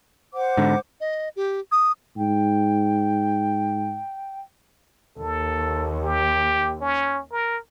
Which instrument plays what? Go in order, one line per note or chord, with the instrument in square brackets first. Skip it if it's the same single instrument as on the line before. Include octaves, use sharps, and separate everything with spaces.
[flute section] C5 F#5 D6
[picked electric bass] G#2 D3
[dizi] D#5
G4
D#6
[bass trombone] G#2 [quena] G5
[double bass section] D#2 [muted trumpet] A4
[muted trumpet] G4
C#4
A#4